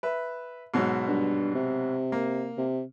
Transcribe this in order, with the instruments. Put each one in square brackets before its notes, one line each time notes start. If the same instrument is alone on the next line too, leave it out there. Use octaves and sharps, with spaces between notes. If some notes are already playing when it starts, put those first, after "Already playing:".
[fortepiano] B4 E5
G#2 B2 F#3
[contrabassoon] G2
C3
[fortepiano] A#3
[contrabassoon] C3